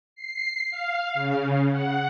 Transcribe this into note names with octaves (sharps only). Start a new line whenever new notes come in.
C7
F5
C#3
F#5